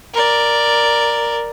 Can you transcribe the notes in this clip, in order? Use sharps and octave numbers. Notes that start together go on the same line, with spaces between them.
A#4 D5